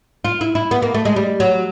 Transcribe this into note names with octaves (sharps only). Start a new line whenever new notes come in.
F4
E4
E4
B3
A#3
A3
G#3
G3
F#3